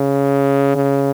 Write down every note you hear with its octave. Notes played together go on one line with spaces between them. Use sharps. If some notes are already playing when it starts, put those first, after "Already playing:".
Already playing: C#3
C#3